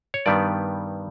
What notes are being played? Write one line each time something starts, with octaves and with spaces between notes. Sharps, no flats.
C#5
G2 D#3 G3 B3 D5